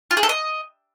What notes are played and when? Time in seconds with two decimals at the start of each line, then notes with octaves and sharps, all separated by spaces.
0.11 F4
0.17 G#4
0.23 A4
0.29 D#5